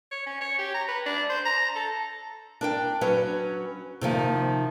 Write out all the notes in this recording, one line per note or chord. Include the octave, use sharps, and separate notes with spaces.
C#5
C#4
C#5
G4
A#5
B4
D4
C5
A#5
A4
D4 A#4 G5
F#3 C#4 B4
C3 D#3 F3 A#3